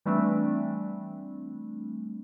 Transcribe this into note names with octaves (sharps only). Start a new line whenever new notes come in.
E3 G3 A3 C4 D4